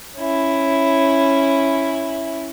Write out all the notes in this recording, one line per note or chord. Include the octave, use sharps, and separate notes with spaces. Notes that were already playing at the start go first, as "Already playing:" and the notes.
C#4 E4